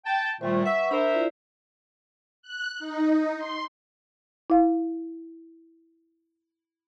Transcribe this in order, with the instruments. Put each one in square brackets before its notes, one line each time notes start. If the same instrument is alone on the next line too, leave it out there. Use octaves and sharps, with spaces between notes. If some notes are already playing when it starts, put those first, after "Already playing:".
[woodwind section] G5 A5
[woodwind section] A#2 D#3 A3 [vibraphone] G3 F4 C5
[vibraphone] B4 F#5 C#6 [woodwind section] E5
[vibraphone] D4 B5 [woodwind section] A#4 C5 E5
[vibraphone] E4 F4 D5
[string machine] F#6
D#4
C6
[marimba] E4 F5